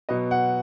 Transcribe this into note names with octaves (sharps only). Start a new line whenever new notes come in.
B2 F#3 B3 D#5
F#5